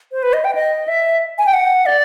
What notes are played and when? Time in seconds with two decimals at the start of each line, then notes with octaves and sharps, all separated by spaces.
0.12 C5
0.23 B4
0.33 D#5
0.44 G5
0.55 D#5
0.88 E5
1.38 G#5
1.46 G5
1.53 F#5
1.86 D5